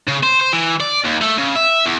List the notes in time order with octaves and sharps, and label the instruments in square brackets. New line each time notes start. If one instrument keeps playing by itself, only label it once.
[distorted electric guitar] C#3
C5
C5
E3
D5
D#2
A3
C#3
E5
E2